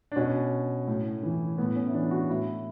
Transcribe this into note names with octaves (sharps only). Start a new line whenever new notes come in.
D4
B2 C#4
A2
E3
A2 B3
C#4
E4
E3 D4
F#4
A2 E4